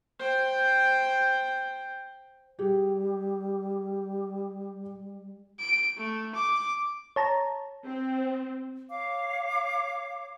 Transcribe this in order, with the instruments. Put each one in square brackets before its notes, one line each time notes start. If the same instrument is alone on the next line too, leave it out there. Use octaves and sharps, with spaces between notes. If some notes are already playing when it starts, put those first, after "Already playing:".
[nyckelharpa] C5 G5
[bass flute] G3 [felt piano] G4 G#4
[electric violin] D7
A3
D6
[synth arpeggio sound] C#5 A5 A#5
[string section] C4
[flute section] C#5 F5 D6